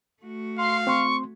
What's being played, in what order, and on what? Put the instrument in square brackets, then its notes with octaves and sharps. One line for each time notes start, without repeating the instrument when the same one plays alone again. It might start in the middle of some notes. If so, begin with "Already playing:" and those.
[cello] A3 F#4
[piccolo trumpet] F5 [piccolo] C6
[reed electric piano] C4 C6 [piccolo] C#6